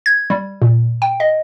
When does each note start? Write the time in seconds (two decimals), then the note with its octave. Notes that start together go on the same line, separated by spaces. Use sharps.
0.06 G#6
0.30 G3
0.62 A#2
1.02 G5
1.20 D#5